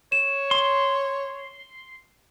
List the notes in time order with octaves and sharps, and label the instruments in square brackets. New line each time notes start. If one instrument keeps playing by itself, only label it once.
[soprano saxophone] C#5 [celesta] E7
[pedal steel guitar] C6